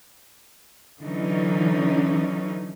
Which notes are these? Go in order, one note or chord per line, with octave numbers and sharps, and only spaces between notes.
D3 E3 F#3 C#4 D#4